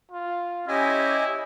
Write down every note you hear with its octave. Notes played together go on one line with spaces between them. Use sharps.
F4
C#4 E4 G4 D#5 G#5